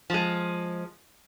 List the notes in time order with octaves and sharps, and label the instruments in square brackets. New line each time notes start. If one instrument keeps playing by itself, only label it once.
[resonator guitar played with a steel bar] F3 G#3